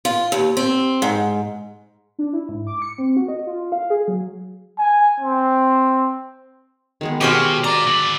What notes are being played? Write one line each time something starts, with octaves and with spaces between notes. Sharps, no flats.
F4
D#2
C4
G#2
D4
E4
G#2
D6
C#7
C4
F#4
D#5
F4
F5
G#4
F#3
G#5
C4
D#3 G#3 B3
B2 G#3 F#4 G4 C5 C#5 F5
F4 D5 A#5
D3 B5